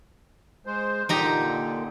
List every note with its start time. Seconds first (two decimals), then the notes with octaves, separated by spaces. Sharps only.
0.66 G#3 C5
1.09 A#2 D3 D#4 G4 A#5